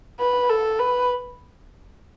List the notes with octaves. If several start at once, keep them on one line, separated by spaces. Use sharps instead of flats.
B4
A4
B4